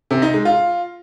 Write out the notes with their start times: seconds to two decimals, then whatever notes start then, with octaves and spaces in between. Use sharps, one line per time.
0.11 C3
0.22 D#4
0.34 G#3
0.45 F4